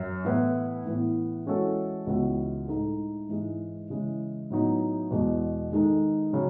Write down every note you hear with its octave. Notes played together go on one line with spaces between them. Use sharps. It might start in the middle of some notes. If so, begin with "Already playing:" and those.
Already playing: F#2 C#4
A2 E3 B3 E4 B4
A2 E3 B3
E3 G#3 C#4 F#4 A4
C#2 C#3 E3 B3 F#4
A2 G#3 D#4 A4
G#2 E3 G#3
C#3 E3 G#3
A2 F#3 B3 D#4
E2 B2 G#3
D#3 G#3 D#4 A4
C#3 F#3